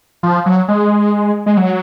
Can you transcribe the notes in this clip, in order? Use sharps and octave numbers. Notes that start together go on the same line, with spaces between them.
F3
F#3
G#3
G#3
F#3